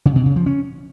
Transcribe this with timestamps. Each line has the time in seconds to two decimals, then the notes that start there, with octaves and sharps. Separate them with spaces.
0.06 C#3
0.16 B2
0.26 C#3
0.36 F3
0.46 C#4